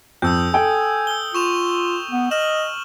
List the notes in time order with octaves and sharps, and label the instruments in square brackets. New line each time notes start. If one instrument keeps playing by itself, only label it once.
[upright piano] F2 [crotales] D#6 E6 G6
[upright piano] A4 G5 [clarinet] G#5
[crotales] E6 G7
[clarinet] F4 [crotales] C#6 E7 F7
[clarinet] B3
[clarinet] D#5 [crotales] F6 E7 F#7